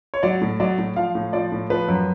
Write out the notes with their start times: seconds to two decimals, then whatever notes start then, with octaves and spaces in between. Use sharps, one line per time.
0.14 C#5
0.23 F#3 D5
0.41 A2
0.60 F#3 D5
0.78 A2
0.96 F3 F5
1.15 A2
1.33 F3 D5
1.52 A2
1.70 F3 B4
1.88 F#2